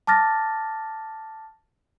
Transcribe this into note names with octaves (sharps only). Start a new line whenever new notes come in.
A5 D6 F6 A6 A#6